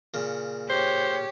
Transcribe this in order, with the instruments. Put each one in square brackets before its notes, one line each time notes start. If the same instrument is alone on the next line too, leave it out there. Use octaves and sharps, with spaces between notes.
[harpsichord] A#2 C#3
[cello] G4 C#5 [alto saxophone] C5